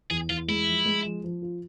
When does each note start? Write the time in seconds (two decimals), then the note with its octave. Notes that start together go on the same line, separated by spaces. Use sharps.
0.10 E2 G#4
0.30 E2 F4
0.48 G#3 E4
0.68 F3
0.86 G#3
1.04 F3
1.24 F3
1.42 F4